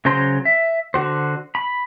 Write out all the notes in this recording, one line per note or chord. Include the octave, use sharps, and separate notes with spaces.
C#3 F#3 C5 A#5 C6
E5
D3 F#4 C5
B5